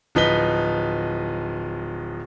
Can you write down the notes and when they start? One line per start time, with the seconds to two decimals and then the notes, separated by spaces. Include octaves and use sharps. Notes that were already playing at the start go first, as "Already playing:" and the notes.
0.15 D1 F3 D#4 B4 B6 G7